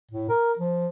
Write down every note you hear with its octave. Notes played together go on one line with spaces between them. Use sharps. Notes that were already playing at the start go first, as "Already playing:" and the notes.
A2
A#4
F3